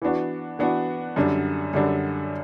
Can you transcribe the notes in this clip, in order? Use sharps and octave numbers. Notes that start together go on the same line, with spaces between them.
E3 B3 D4 F#4
E3 B3 D4 F#4
F#2 D3 G3 D4
F#2 D3 G3 D4